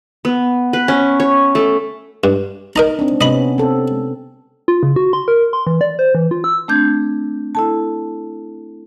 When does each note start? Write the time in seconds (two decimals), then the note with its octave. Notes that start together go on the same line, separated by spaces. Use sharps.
0.25 B3
0.73 B4
0.88 C#4
1.20 C#5
1.55 A3
2.24 G2
2.76 D#4 A#4 D#5 A#5
2.99 C4 D4
3.21 C3 B3 C#4 D#5 B5
3.58 C4 A4
4.68 F4
4.83 C#3
4.96 F#4
5.13 C6
5.28 A#4
5.53 C6
5.67 E3
5.81 D5
5.99 C5
6.15 E3
6.31 F4
6.44 E6
6.68 A3 C4 D4 G6 G#6
7.55 E4 A4 A5